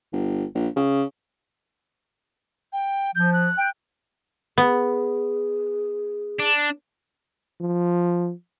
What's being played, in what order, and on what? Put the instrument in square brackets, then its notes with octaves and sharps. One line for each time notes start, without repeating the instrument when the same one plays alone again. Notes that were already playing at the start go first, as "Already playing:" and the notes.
[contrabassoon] G1
A#1
C#3
[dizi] G5
[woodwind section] F3 [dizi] G6
[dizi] F#6
[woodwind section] G5
[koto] B3 [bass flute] G#4
[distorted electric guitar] D4
[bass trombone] F3